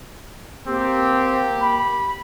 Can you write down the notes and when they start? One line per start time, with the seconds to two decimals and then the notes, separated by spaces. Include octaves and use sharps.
0.67 A#3 C4 G4
1.62 B5